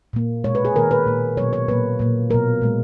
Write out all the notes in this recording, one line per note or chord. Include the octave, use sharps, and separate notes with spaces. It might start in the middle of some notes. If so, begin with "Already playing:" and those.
A#2 A#3
B2 G#3 C#5
B4
G#4
D#3 A#3 A#4
B4
A#2 A#3
B2 F#3 A#3 C#5
C#5
A#2 F#3 A#3 B4
A#2 A#3
B2 F#3 A#3 A#4
A#2 G#3